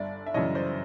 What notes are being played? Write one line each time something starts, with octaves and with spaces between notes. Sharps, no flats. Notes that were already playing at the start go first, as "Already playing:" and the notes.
Already playing: G1 D5 E5
E5
F#2 C#3 E3 C#5 D#5
C5 D5